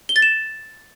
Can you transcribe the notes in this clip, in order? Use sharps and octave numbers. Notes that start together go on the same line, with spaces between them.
G7
A6
E7